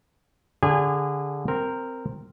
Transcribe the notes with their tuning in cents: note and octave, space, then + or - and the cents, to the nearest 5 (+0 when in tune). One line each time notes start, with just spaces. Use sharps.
D3 -15 G#4 -30 G#5 -15
C4 +0 A#4 -10